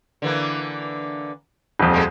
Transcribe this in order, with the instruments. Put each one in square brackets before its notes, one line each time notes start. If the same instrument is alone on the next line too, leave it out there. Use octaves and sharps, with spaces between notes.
[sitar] D3 E3 A#3
[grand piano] D#1 F2
[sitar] G#3 A4